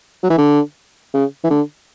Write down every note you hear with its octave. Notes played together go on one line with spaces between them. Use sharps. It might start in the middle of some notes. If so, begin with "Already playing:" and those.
F#3
E3
D3
C#3
E3
D3